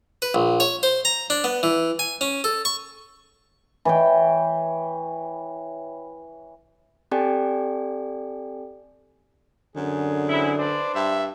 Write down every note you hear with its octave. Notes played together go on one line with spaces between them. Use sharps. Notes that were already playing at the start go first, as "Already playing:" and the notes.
B4
A#1
C#5
C5
A#5
D4
B3
E3
G#5
C#4
A4
C#6
E3 C#5 G5
C4 G4 A4 D5 G5 G#5
F#2 D3 G#4
G#3 C4 E4
D4 B4 C5 D5
G2 E5